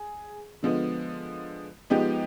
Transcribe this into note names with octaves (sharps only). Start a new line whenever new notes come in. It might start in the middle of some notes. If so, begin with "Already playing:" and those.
Already playing: G#4
D3 F3 G#3 B3
F3 G#3 B3 D#4 G4